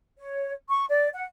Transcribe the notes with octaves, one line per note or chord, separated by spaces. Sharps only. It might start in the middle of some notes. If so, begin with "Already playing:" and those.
C#5
C#6
D5
F#5